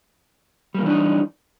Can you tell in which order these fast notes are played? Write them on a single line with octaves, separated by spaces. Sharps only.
G3 A#3 E3 D4 D#4